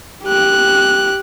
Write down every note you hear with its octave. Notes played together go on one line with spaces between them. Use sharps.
G4 F#6